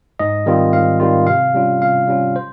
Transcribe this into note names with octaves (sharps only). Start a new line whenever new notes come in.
G#2 D#5
D#3 G3 C4 F4
G#2 F5
D#3 G3 C4 F4
C3 F5
G3 C#4 F4
C3 F5
G3 C#4 F4
C5